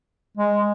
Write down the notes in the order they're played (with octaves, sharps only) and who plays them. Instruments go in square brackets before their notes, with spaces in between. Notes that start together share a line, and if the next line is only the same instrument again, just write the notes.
[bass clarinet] G#3